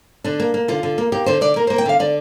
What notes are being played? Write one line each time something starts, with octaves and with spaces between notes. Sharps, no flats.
D3 D4
A#3
A#3
D3 F4
D3
A#3
A#3 G4
D3 C5
D3 D5
A#3 A#4
C5
A#3
G5
D3 F5
D3 D5